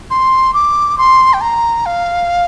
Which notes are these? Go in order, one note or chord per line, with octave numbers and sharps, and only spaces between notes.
C6
D6
C6
G5
A#5
F5